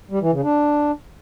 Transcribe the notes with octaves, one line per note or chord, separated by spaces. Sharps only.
G3
E3
C#3
D4